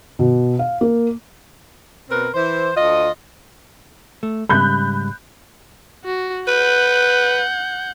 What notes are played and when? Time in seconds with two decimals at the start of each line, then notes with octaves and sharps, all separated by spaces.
0.19 B2
0.59 F5
0.81 A#3
2.09 B2 C4 A#4 B4
2.33 E3 C5
2.74 D2 F4 D#5
4.23 A3
4.49 G#2 C#3 G3 B5 F#6 G6
6.05 F#4
6.48 B4 F#5 G6